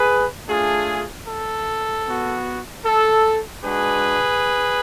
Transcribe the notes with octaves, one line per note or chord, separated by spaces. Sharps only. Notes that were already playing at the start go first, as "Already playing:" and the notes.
Already playing: G#4 B4
A3 D4 F4 G#4
A4
B3 F#4
A4
G#3 D4 F#4 G#4 B4